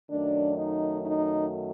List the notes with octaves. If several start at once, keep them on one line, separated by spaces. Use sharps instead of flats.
F#2 D#3 F#3 A3 D4
D#4
D#4